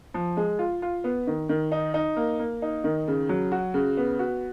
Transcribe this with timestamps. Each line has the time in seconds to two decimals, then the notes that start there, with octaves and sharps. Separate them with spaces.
0.14 F3
0.37 G#3
0.59 F4
0.82 F4
1.04 B3
1.27 D#3
1.49 D#3
1.72 D#4
1.94 D#4
2.16 A#3
2.39 A#3
2.62 D#4
2.84 D#3
3.08 C#3
3.29 F#3
3.52 F#4
3.74 C#3
3.97 B3
4.19 F#4